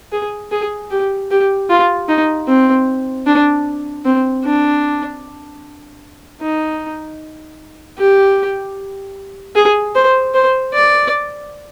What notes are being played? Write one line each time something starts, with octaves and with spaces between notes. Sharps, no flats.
G#4
G#4
G4
G4
F4
D#4
C4
D4
C4
D4
D#4
G4
G#4
C5
C5
D5